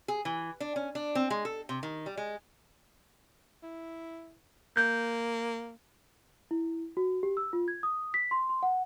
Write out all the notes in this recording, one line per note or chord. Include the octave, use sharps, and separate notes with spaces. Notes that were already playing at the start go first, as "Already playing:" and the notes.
G#4
E3
D4
C#4
D4
C4
G#3
A4
C3
D#3
G3
G#3
E4
A#3 G6
E4
F#4
G4
E6
F4
G#6
D#6
B6
C6
C6
F#5